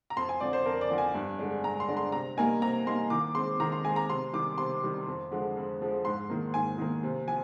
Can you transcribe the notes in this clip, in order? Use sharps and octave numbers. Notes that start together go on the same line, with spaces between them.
A#5
F2 C6
G#5
D3 F3 C4 D5
C5
F2 A#4
D5
D3 F3 C4
G#5
G2
D3 G#3 D4
G2 A#5
C6
D3 G#3 D4
C6
C3 A#5
G3 A#3 D#4 G#5
C3 A#5
G3 A#3 D#4 C6
D#3 D6
G#3 C4 C6
D#3 A#5
C6
G#3 C4 G#5
A#5
C3 C6
D#3 G3 D6
C3 C6
D#3 G3
F2
D3 F3 G#3
F2
D3 F3 G#3
G#2 C6
D#3 A#3
G#2 G#5
D#3 A#3
C3
F3 G#5